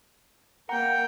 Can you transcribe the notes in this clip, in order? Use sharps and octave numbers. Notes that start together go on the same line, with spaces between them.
A#3 F#5 G5 A#5